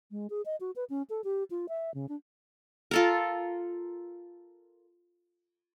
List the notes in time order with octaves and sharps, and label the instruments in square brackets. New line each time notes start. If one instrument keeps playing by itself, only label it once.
[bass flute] G#3
G#4
D#5
F#4
B4
C#4
A4
G4
F4
E5
C#3
D4
[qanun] F4 A4 A#4